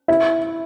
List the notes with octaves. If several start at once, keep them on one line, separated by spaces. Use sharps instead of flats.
E4